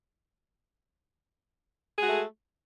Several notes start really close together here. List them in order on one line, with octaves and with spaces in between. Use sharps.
G#4 G#3 F#4 A3